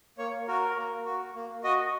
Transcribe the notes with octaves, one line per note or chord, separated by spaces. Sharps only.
A#3 C#5
F#4 A#4
A#3
F#4
A#3
F#4 D#5